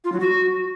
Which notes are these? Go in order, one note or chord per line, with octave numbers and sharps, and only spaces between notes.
F4
F#3
F#4